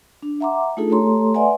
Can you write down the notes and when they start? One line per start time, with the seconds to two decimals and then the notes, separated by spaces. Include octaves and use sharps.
0.23 D4
0.41 E5 F#5 A#5 C6 D6
0.77 A3 D4 D#4 F4 G#4 A4
0.90 A3 G4 A4 C#5 A#5 C6
1.34 B4 D5 E5 F#5 G#5 C6